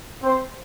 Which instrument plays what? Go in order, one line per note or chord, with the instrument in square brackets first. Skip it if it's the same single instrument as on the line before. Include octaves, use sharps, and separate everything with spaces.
[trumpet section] C4 C5